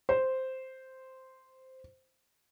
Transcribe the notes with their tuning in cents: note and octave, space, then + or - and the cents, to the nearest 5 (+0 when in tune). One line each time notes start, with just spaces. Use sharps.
C5 -5